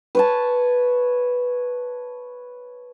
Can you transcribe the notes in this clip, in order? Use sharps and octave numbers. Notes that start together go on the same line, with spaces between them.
B4 C#5 A5